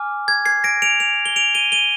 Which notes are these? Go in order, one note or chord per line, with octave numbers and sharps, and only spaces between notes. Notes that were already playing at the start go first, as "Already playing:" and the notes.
Already playing: G#5 D6 F6
G#6
G#6 C7
A#6 D7
D7 F7
D7 F7
G7
D7 F7
D#7 G7
D#7 G7